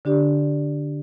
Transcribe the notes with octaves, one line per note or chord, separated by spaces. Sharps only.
D3 D4 G4 D5